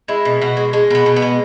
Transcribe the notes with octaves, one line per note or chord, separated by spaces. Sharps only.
G#3 E4
B2
B2 F#4
G#3
G#3
B2 B3
B2
B3
G#3